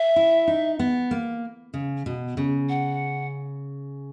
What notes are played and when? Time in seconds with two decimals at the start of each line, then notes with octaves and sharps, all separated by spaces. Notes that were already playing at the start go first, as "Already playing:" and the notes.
Already playing: E5
0.16 E4
0.47 D#4
0.79 B3
1.11 A#3
1.74 C#3
2.06 B2
2.37 C#3
2.69 F#5